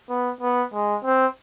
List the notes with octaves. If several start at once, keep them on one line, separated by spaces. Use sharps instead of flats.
B3
B3
G#3
C4